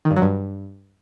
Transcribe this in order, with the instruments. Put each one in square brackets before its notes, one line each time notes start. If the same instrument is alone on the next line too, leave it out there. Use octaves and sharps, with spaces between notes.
[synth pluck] D#3
G2
F#3
G2